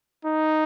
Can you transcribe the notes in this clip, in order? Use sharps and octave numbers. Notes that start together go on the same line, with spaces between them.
D#4